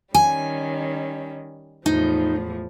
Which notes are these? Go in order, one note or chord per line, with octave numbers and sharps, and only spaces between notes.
D#3 G3 C#4 G#5
E2 A2 F3 D#4